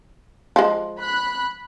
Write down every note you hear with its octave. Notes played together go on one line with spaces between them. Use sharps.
F3 G#3
B5 F#6